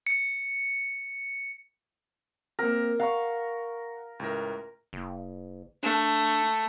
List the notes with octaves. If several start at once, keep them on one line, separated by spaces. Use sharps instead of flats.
C#7
A#3 C4 A#4
F5 F#5 A#5 C#6
C#2 A2 A#4
F#1
A3 D4